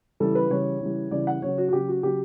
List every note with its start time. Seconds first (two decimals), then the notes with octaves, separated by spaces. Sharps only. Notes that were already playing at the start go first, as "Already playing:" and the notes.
0.20 C#3 E3 G3 A4
0.35 B4
0.50 C#3 E3 G3 C#5
0.81 C#3 E3 G3
1.11 C#3 E3 G3 D5
1.27 F#5
1.42 C#3 F#3 C#5
1.58 F#4
1.69 F#4
1.73 C#3 F#3 G4
1.88 F#4
2.03 C#3 F#3 G4